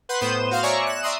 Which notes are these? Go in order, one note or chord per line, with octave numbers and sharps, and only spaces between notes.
B4 F#5 C6 F#6 G6
A2 B3 C5 D#6 G6 E7
F#4 F5 C6
C#5 D5 E5 G#5 A#5 C#6
F#6 E7
D5 E5 A#5 C6 D#6